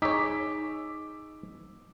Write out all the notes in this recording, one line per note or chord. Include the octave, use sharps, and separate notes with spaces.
D#4 G#4 C#5 D6 E6 B6